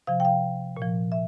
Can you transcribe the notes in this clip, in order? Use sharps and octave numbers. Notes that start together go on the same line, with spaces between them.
C3 F3 F5
G5
F5
A#2
F3
E5